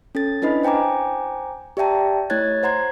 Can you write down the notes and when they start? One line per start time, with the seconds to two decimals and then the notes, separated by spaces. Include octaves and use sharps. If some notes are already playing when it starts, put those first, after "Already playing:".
0.15 C#4 A4 A6
0.42 C#4 D4 E4 B4 D#5 B5
0.63 C5 G5 G#5 A#5 D6
1.77 G4 D5 E5 G5 A5 A#5
2.30 A3 E4 C#5 F#6 G#6 A6
2.63 C5 F#5 A#5 C6 G#6